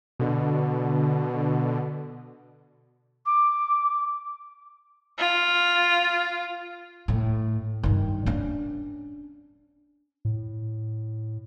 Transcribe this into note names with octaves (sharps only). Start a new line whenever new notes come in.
B2 D3
D6
F4
A2
G2 D#3
C#4 D4
A2